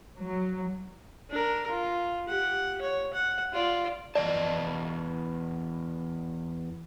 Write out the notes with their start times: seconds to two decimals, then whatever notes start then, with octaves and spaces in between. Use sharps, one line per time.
0.21 F#3
1.30 D4 A#4
1.70 F4
2.28 G4 F#5
2.81 C#5
3.14 F#5
3.53 F4 D5
4.15 E2 D5 D#5 A5